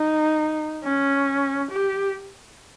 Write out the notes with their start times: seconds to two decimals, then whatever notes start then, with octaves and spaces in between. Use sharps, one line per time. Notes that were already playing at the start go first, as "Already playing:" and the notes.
Already playing: D#4
0.84 C#4
1.70 G4